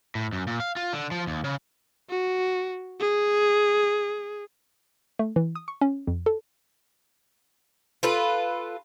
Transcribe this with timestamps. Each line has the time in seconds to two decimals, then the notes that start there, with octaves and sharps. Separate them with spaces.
0.15 A2
0.33 F#2
0.47 A#2
0.60 F5
0.76 F4
0.93 D3
1.11 F3
1.27 D#2
1.44 C#3
2.10 F#4
3.00 G#4
5.19 A3
5.36 E3
5.55 D#6
5.68 C#6
5.81 C#4
6.07 F2
6.26 A4
8.03 F4 A4 B4